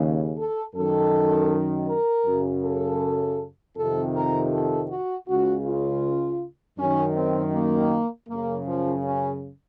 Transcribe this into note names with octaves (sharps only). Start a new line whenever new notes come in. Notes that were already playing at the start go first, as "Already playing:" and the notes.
Already playing: D#2 C#3
A4
F#2 D#3 A4
A#4
F#2 C#3
A4
F2 C3 D#3 A4
A#4
A4
F#4
C#2 C#3 F#4
F4
F#2 D#3 C#4
C4
A#3
F#2 C#3 A#3
F3
C#4